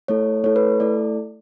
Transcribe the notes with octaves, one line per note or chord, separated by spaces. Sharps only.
A3 E4 A4 C#5
A3 E4 A4 C#5
B4
A3 E4 A4 D5